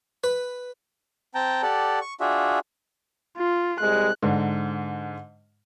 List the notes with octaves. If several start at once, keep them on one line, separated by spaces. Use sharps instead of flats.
B4
C4 G5 A5 A#5
G4 A4 D5 F#5
C#6
D4 F4 F#4 G#4 E5
F4
C2 C3 G#3 F#6
G#2 D3